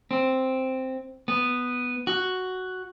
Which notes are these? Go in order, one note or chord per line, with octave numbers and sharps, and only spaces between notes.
C4
B3
F#4